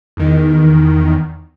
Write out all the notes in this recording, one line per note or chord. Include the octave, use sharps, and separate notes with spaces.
E2 D#3